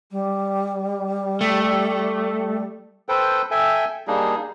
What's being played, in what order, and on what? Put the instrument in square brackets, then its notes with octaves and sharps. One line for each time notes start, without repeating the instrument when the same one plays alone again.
[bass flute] G3
[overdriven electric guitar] A3
[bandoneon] A4 B4 C5 G5
A4 E5 G5 G#5
G3 A#3 D4 D#4 G#4